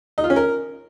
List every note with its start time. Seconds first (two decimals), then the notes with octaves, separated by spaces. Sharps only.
0.18 D#4
0.24 F4
0.30 C#4
0.36 A#4